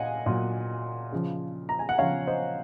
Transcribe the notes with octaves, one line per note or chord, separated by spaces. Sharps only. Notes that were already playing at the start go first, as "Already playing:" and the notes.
Already playing: A#2 D#5 F5 F#5 G#5
A#2 F#3
C#3 F3
A#5
G#5
F#5
C#3 F3 C#5 F5
C5 D#5